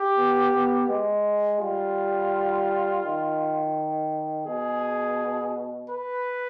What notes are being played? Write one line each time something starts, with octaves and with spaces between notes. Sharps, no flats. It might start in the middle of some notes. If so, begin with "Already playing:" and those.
Already playing: G4
B3
B3
G#3
G3 F4
D#3
B2 G#4
B4